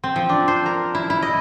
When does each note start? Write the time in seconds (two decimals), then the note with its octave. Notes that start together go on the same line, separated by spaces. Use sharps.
0.04 C4
0.16 F3
0.29 D4
0.48 C5
0.66 A#4
0.95 E4
1.10 E4
1.23 D#5